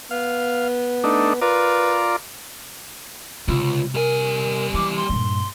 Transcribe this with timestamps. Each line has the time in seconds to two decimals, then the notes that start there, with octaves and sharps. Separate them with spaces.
0.11 B3 F5
1.04 A3 D4 D#4
1.41 F4 A#4 B4 D5
3.48 C#2 C3 F4
3.95 G3 A#4 G#5
4.74 E3 D6
4.97 C6
5.09 G2 A#2